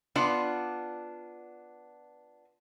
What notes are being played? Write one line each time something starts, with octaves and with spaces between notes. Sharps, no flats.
B3 D4 F4 D5